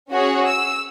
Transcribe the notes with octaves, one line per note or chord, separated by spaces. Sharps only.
C#4 F#4 G#4 C#5
E6